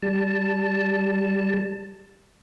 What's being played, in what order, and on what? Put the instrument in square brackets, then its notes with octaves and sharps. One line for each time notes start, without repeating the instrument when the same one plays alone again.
[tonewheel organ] G3 A5